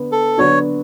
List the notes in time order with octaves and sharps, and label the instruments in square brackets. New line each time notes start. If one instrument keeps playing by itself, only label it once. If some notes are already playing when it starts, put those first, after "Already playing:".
Already playing: [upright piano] D3 B3 D4
[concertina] A4
[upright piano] D3 F#3 B3 D4 F#4 [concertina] C#5